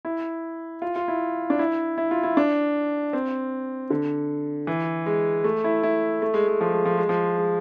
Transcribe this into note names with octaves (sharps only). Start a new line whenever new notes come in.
E4
F4
F4
E4
D4
E4
E4
F4
E4
D4
C4
D3
E3
G#3
A3
E4
E4
A3
G#3
G#3
F3
G#3
F3
G#3
F3
G#3